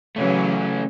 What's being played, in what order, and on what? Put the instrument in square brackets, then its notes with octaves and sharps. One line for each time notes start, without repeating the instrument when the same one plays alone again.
[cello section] C#3 E3 F#3 [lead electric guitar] A3 C#4